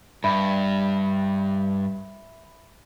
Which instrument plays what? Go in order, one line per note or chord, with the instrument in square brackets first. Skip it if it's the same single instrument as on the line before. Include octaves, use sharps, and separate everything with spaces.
[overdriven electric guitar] G2 [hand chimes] E5 B5